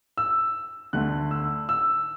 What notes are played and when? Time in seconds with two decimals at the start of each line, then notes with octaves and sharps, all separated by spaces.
0.18 E6
0.93 D2 D3 A3 F#6
1.31 E6
1.69 E6